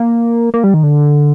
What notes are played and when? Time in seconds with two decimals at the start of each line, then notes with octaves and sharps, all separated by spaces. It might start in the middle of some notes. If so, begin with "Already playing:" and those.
Already playing: A#3
0.54 A#3
0.64 G3
0.74 D#3
0.83 D3